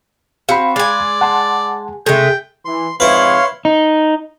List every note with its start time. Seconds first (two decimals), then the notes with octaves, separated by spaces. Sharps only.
0.49 C4 F#4 F5 B5
0.76 G#3 D5 G#5
1.21 F#5 A5 C6
2.06 C3 G#3 A3 A4 G5
2.65 E3 C6
3.00 F2 G#2 E4 B4 C#5 F5 C6
3.65 D#4